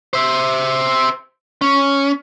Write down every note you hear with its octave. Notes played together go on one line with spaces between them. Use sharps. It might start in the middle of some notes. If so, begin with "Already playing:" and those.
C5 E5
C#4